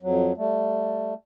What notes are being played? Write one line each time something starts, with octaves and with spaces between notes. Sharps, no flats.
F2 F#3
G3 A3